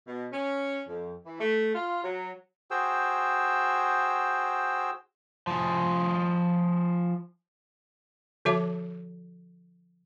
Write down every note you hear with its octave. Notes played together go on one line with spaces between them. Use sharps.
B2
C#4
F2
E3
A3
F4
F#3
F#4 G#4 C5 G5 E6
F3 G#4
D3 F3 F#4 C#5 E5 A5